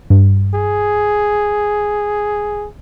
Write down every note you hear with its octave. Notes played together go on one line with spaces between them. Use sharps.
G2
G#4